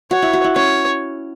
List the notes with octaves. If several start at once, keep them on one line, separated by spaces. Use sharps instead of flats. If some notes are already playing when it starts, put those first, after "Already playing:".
F#4 C#5
E4
F#4
E4
C#4 C#5